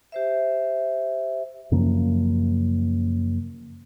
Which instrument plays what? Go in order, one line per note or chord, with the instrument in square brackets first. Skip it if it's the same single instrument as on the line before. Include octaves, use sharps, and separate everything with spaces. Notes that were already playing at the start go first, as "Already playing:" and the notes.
[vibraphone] G4 C5 E5
[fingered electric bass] F#2 C#3 F3 A#3